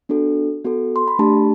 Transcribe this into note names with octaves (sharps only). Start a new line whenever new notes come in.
B3 D4 F#4 A4
B3 F#4 A4
C6
B5
A3 D4 G4 A5